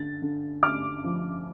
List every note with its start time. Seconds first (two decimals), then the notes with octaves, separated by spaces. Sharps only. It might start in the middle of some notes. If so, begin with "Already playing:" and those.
Already playing: D3 A6
0.22 D3
0.63 D3 D6 F6
1.04 F3